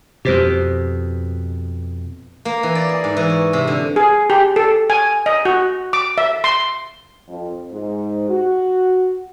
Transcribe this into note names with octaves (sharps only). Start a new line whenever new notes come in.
F2 B2 G4 C5 D7
A#3
E3
D5
G#4
G#2
E3
C#5
C3
D3
G#4
G4
A4
G#5
D#5
F#4
D6
E5
C6
F2
G#2
F#4